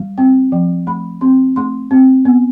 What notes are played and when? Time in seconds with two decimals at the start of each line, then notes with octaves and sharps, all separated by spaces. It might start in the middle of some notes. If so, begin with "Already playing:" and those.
Already playing: G3
0.18 C4 G5
0.52 F3 G5
0.87 A3 B5
1.21 C4 C6
1.56 A3 C6
1.91 C4
2.25 B3